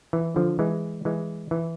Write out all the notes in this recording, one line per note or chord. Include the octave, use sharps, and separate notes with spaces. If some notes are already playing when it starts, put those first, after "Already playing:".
E3
D3 F3
E3 G#3
E3 G#3
E3